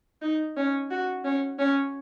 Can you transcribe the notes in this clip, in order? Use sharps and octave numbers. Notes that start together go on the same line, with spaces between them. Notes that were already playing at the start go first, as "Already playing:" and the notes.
D#4
C#4
F#4
C#4
C#4